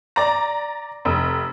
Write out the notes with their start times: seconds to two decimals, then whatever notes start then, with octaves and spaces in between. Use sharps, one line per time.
0.16 D5 A#5
1.05 F1